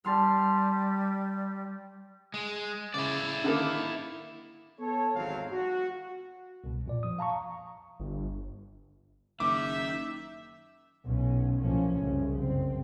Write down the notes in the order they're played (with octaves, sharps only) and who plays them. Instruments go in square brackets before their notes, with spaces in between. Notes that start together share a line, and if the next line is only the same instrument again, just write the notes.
[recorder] G3 [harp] A5 C6 F6
[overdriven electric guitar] G#3
[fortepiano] C#3 E5 [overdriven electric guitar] E4 D5
[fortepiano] D3 D#3 A#3
[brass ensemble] B3 A4 C#5
G#1 E2 F#3 C4 F5
F#4
[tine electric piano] C2 B2
F2 A#2 D5
F3 D#6
F5 A5 A#5 C#6
[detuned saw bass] G1
[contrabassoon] F#1 [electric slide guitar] D#3 [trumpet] E5 [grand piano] D6
[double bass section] B1 B2 C#4
C2 A2 F3 A#3 C#4
F1 C2 F#2 C#3
F#1 C4